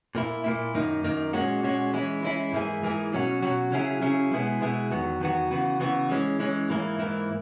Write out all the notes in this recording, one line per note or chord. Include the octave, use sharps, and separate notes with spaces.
A#2 A#3 E4
A#2 A#3 E4
F#2 D#3 A#3 D#4
F#2 D#3 A#3 D#4
A#2 G#3 C#4 F#4
A#2 G#3 C#4 F#4
E3 G#3 C#4 E4
E3 G#3 C#4 E4
G#2 E3 A#3 E4 G#4
G#2 E3 A#3 E4 G#4
B2 F#3 C#4 F#4
B2 F#3 C#4 F#4
C#3 F#3 C#4 E4 G#4
C#3 F#3 C#4 E4 G#4
B2 G#3 B3 E4 G#4
B2 G#3 B3 E4 G#4
E2 D#3 F#3 B3 F#4
E2 D#3 F#3 B3 F#4
C#3 E3 B3 F#4
C#3 E3 B3 F#4
E3 G#3 C#4
E3 G#3 C#4
G#2 E3 A#3 E4
G#2 E3 A#3 E4